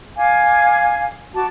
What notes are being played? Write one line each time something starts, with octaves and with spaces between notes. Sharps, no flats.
F5 G#5 D6
F#4 A5 D6